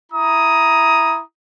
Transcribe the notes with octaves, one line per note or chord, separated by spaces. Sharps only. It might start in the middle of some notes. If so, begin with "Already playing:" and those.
E4 A#5 D#6